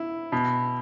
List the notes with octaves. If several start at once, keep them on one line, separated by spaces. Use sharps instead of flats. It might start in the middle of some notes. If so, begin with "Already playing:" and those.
Already playing: E4
B2